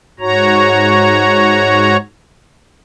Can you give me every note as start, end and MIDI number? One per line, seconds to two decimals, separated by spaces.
0.20 1.97 44
0.20 1.97 66
0.20 1.97 73
0.20 1.97 82